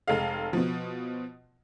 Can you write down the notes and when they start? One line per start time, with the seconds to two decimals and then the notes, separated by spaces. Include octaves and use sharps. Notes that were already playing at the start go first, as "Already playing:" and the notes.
0.08 F1 G#3 A4 F5
0.53 B2 F3